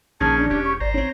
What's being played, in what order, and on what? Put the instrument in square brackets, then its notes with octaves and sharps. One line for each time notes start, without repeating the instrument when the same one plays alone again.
[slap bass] A#1 [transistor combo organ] D#3 C#4 G#4 [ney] A5
[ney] D4
[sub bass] E1 [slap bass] E2 [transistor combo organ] C#4 G4
[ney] C#6
[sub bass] G#1 [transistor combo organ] C5 A#5 [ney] D5
[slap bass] C4 D4 [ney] C#5